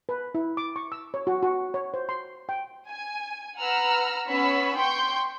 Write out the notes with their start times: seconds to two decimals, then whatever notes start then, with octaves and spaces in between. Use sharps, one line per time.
0.09 B4
0.35 E4
0.57 D6
0.76 C#6
0.92 E6
1.14 C#5
1.27 F#4
1.43 F#4
1.74 C#5
1.94 C5
2.09 C6
2.49 G5
2.88 G#5
3.59 B4 F#5 A#5 E6 F6
4.28 B3 C#4 B5 C#6 E6
4.77 G5 C6 C#6 G6